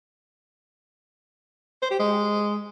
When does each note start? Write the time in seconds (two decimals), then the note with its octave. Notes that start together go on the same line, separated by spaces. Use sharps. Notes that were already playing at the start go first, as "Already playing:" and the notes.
1.82 C5
1.91 G4
2.00 G#3